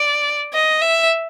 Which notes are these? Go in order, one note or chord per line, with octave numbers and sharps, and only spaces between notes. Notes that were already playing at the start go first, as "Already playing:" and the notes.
Already playing: D5
D#5
E5